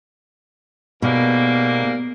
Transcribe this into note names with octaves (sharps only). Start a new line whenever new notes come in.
G#2 B2 G3 A#3